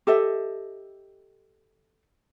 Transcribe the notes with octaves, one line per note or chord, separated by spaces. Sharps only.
G4 A4 D#5 E5